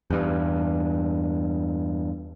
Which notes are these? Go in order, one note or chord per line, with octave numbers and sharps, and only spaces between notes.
E2 G2